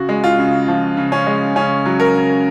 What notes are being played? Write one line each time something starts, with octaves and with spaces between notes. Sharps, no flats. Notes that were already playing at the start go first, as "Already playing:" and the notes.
Already playing: C#3 F#4
G#3
F4
C#3
F3
C#3
C#4
G#3
C#3 C#4
F#3
A#4
C#3